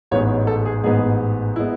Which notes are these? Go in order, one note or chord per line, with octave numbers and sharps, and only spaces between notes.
A1 G#2 G#3 B3 C#5
A4
G#4
A1 G#2 G#3 B3 G#4
G#3 B3 E4